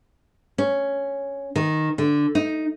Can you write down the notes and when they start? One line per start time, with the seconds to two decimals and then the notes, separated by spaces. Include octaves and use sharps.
0.58 C#4
1.56 D#3
1.98 D3
2.35 D#4